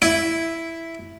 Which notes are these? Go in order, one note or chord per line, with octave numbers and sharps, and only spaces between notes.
E4